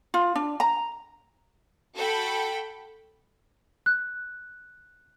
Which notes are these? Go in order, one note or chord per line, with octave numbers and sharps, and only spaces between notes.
F4
D4
A#5
F#4 A4 G5 B5
F#6